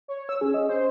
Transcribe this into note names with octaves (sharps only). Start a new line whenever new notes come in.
C#5
E6
C#4 G#4
D#5
C5